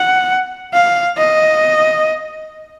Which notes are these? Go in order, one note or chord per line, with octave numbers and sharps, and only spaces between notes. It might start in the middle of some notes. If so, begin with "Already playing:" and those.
Already playing: F#5
F5
D#5